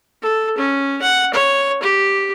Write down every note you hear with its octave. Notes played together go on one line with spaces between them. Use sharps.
A4
C#4
F#5
C#5
G4